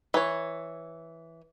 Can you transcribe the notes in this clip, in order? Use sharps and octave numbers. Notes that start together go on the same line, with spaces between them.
E3 C#5